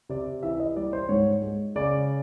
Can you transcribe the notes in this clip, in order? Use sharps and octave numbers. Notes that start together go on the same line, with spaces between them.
C3 D5
E3 E5
D#5
G3 D5
C5
G#2 C#5
G#3
C#3 D5